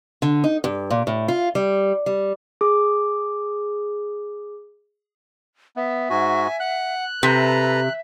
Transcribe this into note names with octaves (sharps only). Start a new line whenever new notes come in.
D3
D#4
G2
A#2
A2
F4
G3
G3
G#4 D6
B3 E5
G#2 F#4 G#5
F#5 F#6
C3 A4 B4 E5 A#5